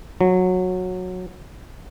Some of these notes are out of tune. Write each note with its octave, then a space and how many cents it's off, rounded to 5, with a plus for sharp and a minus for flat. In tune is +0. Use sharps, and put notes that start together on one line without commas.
F#3 -15